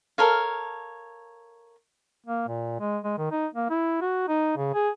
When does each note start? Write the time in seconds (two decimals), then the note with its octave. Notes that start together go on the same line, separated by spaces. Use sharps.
0.18 A4 A#4 C#5 F5
2.26 A#3
2.48 A#2
2.80 G#3
3.04 G#3
3.18 D#3
3.31 D#4
3.55 A#3
3.70 E4
4.01 F#4
4.28 D#4
4.56 C#3
4.74 G#4